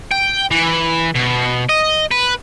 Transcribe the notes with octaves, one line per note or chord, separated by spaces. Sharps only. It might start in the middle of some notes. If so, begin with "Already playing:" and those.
G5
E3
B2
D#5
B4